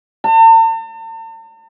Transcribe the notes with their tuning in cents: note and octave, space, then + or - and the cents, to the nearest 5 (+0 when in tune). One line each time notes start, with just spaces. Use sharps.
A5 +45